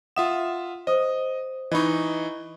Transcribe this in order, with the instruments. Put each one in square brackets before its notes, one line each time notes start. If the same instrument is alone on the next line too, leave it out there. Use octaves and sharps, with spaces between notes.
[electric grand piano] F4 E5 E7 [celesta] F#5 D#6
[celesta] C5 D#6 [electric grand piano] D#5
[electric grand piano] E3 D#4 [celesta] D#5 B5 C#6